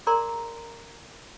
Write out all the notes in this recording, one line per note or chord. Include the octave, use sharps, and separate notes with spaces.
G#4 A#4 D5 A#5 C6